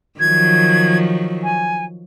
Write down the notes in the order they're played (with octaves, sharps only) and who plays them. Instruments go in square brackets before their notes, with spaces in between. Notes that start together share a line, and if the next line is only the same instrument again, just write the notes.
[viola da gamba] D#3 F3 F#3 [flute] G#6
[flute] G#5